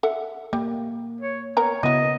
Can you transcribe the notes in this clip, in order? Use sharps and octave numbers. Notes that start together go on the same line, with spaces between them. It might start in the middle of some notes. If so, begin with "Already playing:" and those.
A4 E5 F#5
G3 A#3
C#5
B3 A#4 C#5 A#5
C#3 B3 E4 F#4 D#5